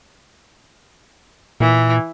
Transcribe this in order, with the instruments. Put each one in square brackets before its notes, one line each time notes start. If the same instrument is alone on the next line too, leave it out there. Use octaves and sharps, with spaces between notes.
[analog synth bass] A#2 [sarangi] E3